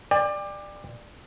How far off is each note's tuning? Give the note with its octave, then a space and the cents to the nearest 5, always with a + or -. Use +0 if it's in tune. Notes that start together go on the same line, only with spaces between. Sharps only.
D5 +15 G5 +40